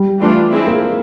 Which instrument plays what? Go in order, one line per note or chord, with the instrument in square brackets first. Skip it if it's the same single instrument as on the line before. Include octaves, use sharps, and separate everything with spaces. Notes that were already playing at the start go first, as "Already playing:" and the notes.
Already playing: [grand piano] G3
[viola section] E3 A3 D4 F4
G#3 C4 E4 G#4
[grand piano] A#3